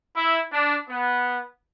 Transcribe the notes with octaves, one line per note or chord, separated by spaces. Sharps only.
E4
D4
B3